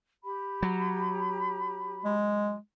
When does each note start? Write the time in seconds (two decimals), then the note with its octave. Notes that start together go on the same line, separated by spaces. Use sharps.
0.25 G4 B5
0.63 F#3
2.05 G#3